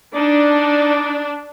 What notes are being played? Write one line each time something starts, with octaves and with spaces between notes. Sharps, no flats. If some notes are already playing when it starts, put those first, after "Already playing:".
D4 D#4 D5